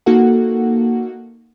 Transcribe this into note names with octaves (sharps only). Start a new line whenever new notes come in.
A#3 D#4 F#4 A4 F#5